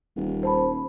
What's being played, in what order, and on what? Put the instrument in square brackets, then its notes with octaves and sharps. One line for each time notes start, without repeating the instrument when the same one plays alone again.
[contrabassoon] D#1
[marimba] C5 A5 B5